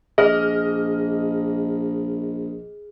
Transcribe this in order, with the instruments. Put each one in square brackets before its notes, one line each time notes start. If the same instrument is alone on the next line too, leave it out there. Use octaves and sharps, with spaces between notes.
[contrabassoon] A#1 [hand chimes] G#4 [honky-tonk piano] D#5 F6